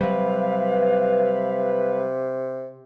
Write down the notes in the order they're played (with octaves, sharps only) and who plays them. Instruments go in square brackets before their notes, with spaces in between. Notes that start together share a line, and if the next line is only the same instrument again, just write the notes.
[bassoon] C3 [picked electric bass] F#3 G3 [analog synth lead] B4 [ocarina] F5